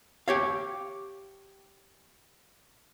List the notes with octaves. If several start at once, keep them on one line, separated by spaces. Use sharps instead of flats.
G4 C#5 F5